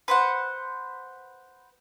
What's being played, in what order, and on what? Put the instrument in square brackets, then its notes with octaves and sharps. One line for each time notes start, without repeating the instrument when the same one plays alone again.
[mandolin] B4 C5 F#5